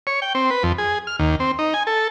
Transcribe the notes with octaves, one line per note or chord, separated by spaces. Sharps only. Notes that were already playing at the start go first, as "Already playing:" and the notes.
C#5
G5
C4
B4
F2
G#4
F6
D#2
C4
D#4
G#5
A4